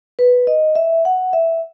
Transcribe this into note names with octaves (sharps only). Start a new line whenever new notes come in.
B4
D#5
E5
F#5
E5